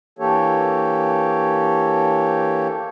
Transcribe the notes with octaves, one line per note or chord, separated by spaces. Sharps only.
E3 A#3 D4 G4 A4 C#5